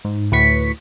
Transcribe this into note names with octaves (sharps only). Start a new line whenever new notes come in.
G#2
D2 A2 B4 C#6 B6 C#7